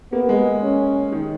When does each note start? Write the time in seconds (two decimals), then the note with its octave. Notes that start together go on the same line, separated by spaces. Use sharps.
0.12 A#3 B3
0.29 G#3
0.63 C#4
1.12 D#3